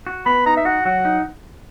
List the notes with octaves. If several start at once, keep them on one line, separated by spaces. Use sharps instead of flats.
F#4
B3 B5
D#4 A#5
E5
F#4 F#5
F#3 F#5
D#4